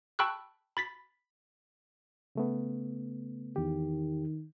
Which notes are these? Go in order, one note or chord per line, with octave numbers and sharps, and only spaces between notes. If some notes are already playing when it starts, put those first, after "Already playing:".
G5 A5 B5 C#6 E6 F#6
B5 A6 B6
C#3 A3 B3
E2 D#3 G4